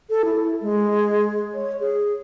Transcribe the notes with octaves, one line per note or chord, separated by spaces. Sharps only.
A4
E4
G#3
C#5
G#4